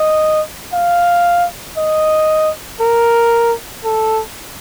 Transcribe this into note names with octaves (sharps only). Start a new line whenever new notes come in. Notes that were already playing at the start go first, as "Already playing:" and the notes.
Already playing: D#5
F5
D#5
A#4
A4